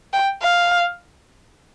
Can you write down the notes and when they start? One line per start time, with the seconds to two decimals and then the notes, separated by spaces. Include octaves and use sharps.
0.13 G5
0.42 F5